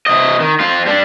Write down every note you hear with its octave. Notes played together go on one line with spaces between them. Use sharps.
C3 D#5
D#3
C4 F4
G3 D4